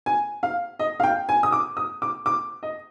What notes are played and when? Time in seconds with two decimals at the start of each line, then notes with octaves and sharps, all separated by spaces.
0.06 G#5
0.43 F5
0.79 D#5
1.00 F5
1.03 G5
1.29 G#5
1.43 D#6
1.52 D6
1.77 D#6
2.02 D6
2.26 D6
2.63 D#5